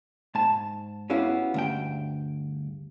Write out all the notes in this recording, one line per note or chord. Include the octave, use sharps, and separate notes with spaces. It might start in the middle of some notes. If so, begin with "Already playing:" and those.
G#2 A5
B3 C#4 E4 F#4 G4 F5
D2 G2 G5